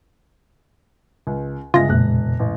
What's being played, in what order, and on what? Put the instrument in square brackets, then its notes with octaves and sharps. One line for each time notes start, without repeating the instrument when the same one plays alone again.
[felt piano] C#2
[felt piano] G1 G#3 A#6 [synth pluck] C#3 [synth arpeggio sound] F4
[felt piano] E1 F#6 [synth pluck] F2 A#2 G#3
[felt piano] A1